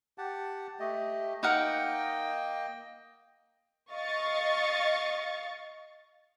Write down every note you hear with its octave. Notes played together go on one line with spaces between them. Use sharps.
G4 F#5 A5
A3 G4 D#5
A#3 D#4 A#4 D#5 F#5 G5
D#5 F5 C#6 A6